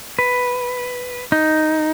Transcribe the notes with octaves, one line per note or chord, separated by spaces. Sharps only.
B4
D#4